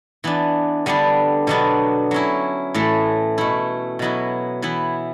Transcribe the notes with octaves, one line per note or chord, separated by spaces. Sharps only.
E3 B3 D4
D3 G3 B3 D4
B2 F#3 B3 D4
F#3 C#4 E4
A2 E3 A3 E4
B2 A3 E4
B2 F#3 B3 E4
E3 B3 E4